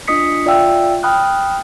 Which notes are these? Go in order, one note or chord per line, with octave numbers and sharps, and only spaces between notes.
D4 F4 D#5 D#6 B6 C#7
F4 D5 E5 F5 G5 E6
G5 B5 D#6 F6 F#6